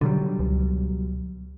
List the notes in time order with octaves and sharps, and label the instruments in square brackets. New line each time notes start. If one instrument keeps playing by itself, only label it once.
[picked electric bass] B2 F#3 G3 [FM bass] D3
[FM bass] C#2